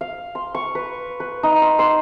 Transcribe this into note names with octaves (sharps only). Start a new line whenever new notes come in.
F5
C6
C#6
B4
B4
D#4
C6
C6